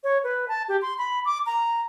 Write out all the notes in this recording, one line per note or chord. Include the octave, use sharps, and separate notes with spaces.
C#5
B4
A5
G4
C6
B5
D6
A#5